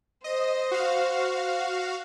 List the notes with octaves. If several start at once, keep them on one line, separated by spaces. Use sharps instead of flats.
C5 D#5
F#4 F5